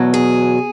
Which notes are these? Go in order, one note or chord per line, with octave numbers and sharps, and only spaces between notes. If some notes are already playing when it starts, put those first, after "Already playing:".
Already playing: E2 B2 F#3
G#4